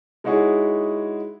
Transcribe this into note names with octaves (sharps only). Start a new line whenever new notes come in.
G#3 D#4 E4 F#4 G#4 C#5